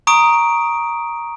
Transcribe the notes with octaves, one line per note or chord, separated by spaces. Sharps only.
A#5 C#6 D#6 D7